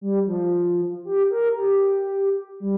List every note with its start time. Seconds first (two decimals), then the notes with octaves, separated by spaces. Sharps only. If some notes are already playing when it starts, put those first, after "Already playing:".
0.01 G3
0.27 F3
1.05 G4
1.30 A#4
1.56 G4
2.60 G3